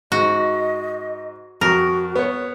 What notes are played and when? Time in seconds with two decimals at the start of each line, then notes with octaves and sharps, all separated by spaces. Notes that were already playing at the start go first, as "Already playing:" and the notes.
0.12 G#2 F#4 D#5
1.61 F2 F#4 A#4
2.16 B3 C#5